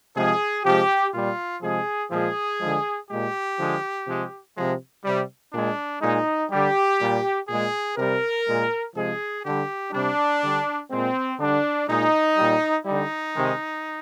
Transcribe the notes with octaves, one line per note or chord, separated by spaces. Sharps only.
C3 F3 G#3 G#4
C3 F3 G#3 G4
A#2 G3 F4
C3 F3 G#3 G#4
A#2 F3 G#3 G#4
D3 F3 G#3
A#2 G#3 G4
D3 F3 G#3
C3 F3 G#3
C3 F3 G#3
C3 G3
A#2 G#3 D4
A#2 G#3 D#4
D3 G3 G4
A#2 G3
A#2 G#3 G#4
C3 G3 A#4
A#2 G#3
C3 F3 G#3 G#4
D3 G3 G4
C3 G3 D4
D3 G3
A#2 G#3 C4
D3 G3 D4
A#2 G#3 D#4
A#2 G3
D3 G3 D#4
C3 D#3 G#3